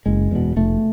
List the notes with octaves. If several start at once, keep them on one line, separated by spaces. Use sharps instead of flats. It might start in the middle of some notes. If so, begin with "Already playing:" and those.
F#1 G#3
E2 B2
F1 A3